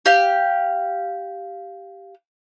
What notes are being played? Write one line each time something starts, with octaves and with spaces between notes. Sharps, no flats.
G4 F5